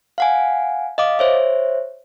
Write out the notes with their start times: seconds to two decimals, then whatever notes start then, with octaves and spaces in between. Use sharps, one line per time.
0.18 F5 F#5 G#5
0.98 D#5 F5 D6
1.19 C5 C#5 E5